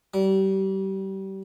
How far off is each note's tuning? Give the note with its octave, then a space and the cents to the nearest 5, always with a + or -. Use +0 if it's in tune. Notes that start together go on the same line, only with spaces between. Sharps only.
G3 -30